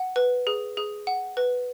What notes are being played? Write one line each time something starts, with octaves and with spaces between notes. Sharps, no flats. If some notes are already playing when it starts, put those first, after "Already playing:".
Already playing: F#5
B4
G#4
G#4
F#5
B4